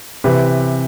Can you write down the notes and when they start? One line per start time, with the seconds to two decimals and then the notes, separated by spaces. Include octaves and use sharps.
0.24 C3 E3 G4 B4